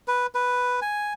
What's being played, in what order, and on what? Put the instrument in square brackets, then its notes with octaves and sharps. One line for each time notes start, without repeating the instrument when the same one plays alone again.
[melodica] B4
B4
G#5